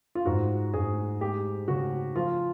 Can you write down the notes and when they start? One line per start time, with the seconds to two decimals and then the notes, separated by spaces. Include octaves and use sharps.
0.15 F4
0.26 G#2 F#4
0.74 G#2 G#4
1.21 G#3 G4
1.68 C#3 F#4
2.16 F3 F4